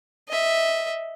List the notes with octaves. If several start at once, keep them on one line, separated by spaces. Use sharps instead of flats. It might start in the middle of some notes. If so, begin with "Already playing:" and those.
D#5 E5